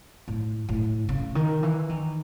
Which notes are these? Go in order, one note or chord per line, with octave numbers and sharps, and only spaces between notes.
A2
A2
C#3
D#3
E3
D#3